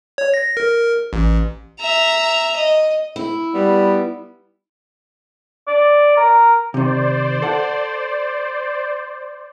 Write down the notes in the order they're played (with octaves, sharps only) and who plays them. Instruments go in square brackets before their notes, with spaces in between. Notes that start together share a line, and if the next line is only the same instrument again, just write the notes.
[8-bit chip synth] C#5
A#6
A#4
A1
[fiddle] E5 A#5
D#5
[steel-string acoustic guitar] E4
[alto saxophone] G3 [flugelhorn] B3
[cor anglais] D5
A#4
[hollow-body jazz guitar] C3 D#3 [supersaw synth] C5 D5
[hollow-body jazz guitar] A4 F#5